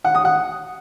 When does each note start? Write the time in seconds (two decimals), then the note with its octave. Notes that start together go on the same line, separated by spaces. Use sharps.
0.04 F#5
0.15 D#6
0.25 F#5